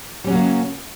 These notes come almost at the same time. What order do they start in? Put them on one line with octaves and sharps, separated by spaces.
G3 C#4 F#3 A#3 C#3